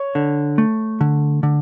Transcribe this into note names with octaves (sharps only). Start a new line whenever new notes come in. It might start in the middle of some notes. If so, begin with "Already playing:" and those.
Already playing: C#5
D3
A3
D3
D3